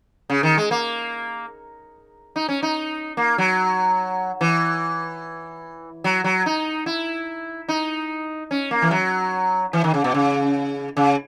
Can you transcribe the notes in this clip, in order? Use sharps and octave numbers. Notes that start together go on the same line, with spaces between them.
C#3
D#3
G#3
A#3
D#4
C#4
D#4
A#3
F#3
E3
F#3
F#3
D#4
E4
D#4
C#4
A#3
E3
F#3
E3
D#3
C#3
B2
C#3
C#3